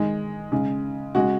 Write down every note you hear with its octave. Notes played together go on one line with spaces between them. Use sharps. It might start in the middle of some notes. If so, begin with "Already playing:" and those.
Already playing: D#3 G#3
C#3 G#3
C#3 G#3 F#4